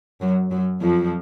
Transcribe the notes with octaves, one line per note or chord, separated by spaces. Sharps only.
F#2 F#3
F#2 F#3
F2 F3